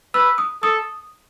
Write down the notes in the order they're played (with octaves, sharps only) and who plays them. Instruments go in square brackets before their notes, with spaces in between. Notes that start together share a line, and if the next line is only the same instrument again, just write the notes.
[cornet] B4 [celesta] E6
[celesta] D#6
[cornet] A4 [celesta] D#6